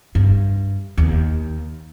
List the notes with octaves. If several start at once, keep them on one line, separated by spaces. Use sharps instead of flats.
G2
D#2